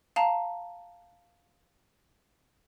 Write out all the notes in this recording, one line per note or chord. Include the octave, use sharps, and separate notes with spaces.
F5 A5 A#5